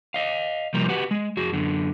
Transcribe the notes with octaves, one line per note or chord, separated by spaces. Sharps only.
D#5 F5
C3 F3 G3 A#3 A#4
F#4 G4 B4 F#5
G#3
F2 F#4 G#4
F#2 D3